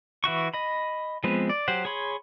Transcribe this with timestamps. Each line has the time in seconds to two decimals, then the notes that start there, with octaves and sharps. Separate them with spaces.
0.24 E3 E4 F#4 C#6
0.54 D#5 B5
1.24 F3 G#3 B3 C4 B4
1.49 D5
1.68 F#3 G4 C5 F#5
1.85 G#4 C#5 B5 C6